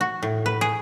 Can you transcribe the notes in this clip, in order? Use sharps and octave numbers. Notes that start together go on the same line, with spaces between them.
F#4
A2
B4
G#4